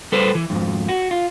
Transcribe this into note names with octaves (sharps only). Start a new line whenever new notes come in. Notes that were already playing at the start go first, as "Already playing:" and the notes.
G3 A4 B4 C5
E3
F2 G#2
F#4
F4